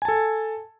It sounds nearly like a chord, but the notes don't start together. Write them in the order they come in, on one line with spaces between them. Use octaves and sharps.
G#5 A5 A4